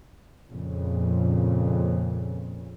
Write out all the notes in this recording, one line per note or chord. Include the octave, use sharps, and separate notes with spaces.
F2 A#2 C#3